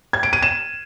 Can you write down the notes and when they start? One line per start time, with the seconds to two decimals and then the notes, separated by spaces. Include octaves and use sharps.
0.13 G#6
0.23 D7
0.33 D#7
0.42 E7